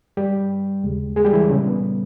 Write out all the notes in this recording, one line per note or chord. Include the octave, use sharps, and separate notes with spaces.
G2 G3 G4
D#2 C#3 G#3
G#3 G#4
G3 G4
E3 E4
A#2 C#3 G3 C#4
B3